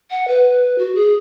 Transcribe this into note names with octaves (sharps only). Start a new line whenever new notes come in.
F#5
B4
F#4
G#4